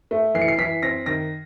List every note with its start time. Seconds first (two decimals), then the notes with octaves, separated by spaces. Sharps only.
0.11 A3
0.35 E3 C7
0.42 C#7
0.48 C7
0.58 E3 B6
0.82 C4 A#6
1.06 D#3 A#6